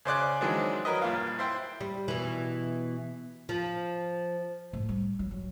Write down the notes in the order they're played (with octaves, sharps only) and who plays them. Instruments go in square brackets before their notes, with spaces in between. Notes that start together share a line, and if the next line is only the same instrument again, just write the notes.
[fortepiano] C#3 C5 D5 F#6
D#3 E3 F#3 G#3 C4 D4
F#3 A#4 B4 D#5
G2 A#2 F5
E4 C5 G5
[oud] G3
B2 E3
F3
[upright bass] A2
G3
F#3
F#3